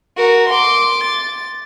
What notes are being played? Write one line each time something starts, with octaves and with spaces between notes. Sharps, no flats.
F#4 A#4
C6 D6
A6